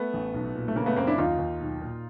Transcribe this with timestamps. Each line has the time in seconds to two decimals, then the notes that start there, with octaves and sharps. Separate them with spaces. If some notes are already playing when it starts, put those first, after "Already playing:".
Already playing: A3 B3
0.14 A1
0.34 B1
0.55 A#2
0.68 A3
0.76 C#3 A#3
0.86 A3 B3
0.96 F#2 A#3 C4
1.07 D4 E4
1.18 D#2 D#4 F4
1.38 D#2
1.60 B1
1.81 A#2